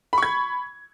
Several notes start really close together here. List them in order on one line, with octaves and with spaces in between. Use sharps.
B5 C#6 G#6